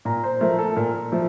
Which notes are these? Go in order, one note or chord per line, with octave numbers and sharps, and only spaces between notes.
A#2 A#5
C5
F3 A3 A#4
A4
A#2 A#4
F3 A3